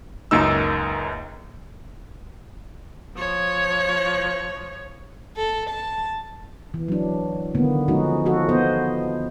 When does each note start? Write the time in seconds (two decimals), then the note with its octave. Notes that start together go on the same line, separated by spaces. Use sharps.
0.31 C#2 F#2 A#3 D#4 E6
3.16 F3 C#5
5.37 A4
5.69 A5
6.74 E3
6.88 F#3 D4
7.55 D3 D#3 A#3 B3
7.88 F3 G#3 C#4 D#4 F#4
8.26 F3 F#4 A4
8.49 B3 C5 D#5